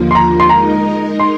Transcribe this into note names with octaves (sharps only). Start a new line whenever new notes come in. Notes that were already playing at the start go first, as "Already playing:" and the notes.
Already playing: D#2 D3 F3 A#3 F4
C6
A#5
C6
G#3 D#4 A#4 D#5 A#5
C6